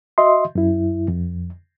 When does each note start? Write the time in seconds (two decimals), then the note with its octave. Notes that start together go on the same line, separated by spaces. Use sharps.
0.18 F#4 D#5 E5 C6
0.55 F#2 E4
1.08 F2